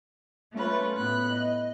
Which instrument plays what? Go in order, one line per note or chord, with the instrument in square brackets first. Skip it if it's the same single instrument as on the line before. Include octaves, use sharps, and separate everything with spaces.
[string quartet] A3 C#4 F4 B4
A2 B3 B5 F#6
D#5